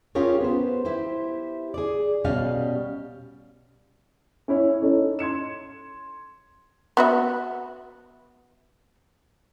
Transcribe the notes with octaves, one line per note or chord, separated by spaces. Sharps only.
C#4 F4 G4 G#4 A#4 C#5
B3 C5
E4 G4 C5
G#4 D5
B2 G3 C#4 D#5 F5 G#5
C#4 E4 C#5
C#4 D#4 E4 A4 C#5
C6 G#6 C#7 E7
B3 F#4 E5